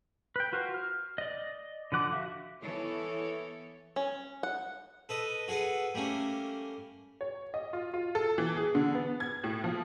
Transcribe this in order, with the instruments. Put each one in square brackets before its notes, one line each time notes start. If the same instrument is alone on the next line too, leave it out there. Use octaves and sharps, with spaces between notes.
[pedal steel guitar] B4 G5
F4 F#4 A#4 C5
F6
D5 D#5
D3 F3 F#5 D6
F#4 E5 F5
[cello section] E3 B3 A4 C#5
[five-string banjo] C#4
F#5
[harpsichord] A4 B4 D#5
F#4 G#4 A4 B4 F#5
G3 A3 A#3 C#4
[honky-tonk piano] C#5
D#5
F4
F4
A4
E3
G#4
D3
B3
G#6
A2
F3